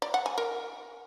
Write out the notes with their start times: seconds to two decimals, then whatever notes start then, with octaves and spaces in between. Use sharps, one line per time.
0.02 D5
0.14 F#5
0.26 G#5
0.38 A#4